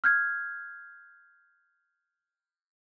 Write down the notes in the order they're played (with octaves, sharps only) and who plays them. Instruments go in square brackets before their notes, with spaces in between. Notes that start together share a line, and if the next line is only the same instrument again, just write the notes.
[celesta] F6 G6 G#6